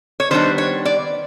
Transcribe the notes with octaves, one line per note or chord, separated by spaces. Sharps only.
C#5
D#3 G3 B3 D4 C5
C#5
D5